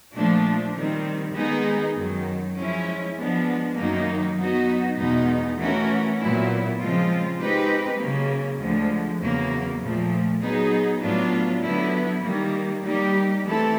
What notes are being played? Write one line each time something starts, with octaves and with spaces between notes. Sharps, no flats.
A#2 F3 A3 D4
D#3 G3 C4
D#3 G#3 B3 D#4 G#4
F#2 D#3 F#3
F3 G#3 C#4 E4
F3 G#3 B3 D4
F#2 D#3 F#3 A#3 D#4
F#3 B3 D#4 F#4
E2 B2 G#3 B3 D#4
E3 A3 C#4 F#4 A#4
A#2 F#3 B3 E4
C#3 F3 G#3 C4 F4
G#3 C4 D#4 G4 B4
C#3 F#3 A#3
D2 D3 F3 G#3
E2 C#3 F#3 A#3
A#2 F3 A3
F#3 B3 D#4 G#4
A2 F#3 B3 D4 F4
D3 F#3 B3 E4
D#3 G3 A#3
G3 A#3 D#4 G4
E3 A3 C4 E4 A4